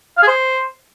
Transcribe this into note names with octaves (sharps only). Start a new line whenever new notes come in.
F5
G#4
C5